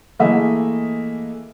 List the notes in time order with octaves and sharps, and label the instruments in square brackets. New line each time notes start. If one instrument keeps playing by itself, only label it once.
[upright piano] E3 A3 A#3 G#4 D#5 E5